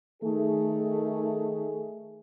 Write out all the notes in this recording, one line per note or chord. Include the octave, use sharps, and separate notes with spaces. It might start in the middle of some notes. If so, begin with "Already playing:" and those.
D#3 A3 G#4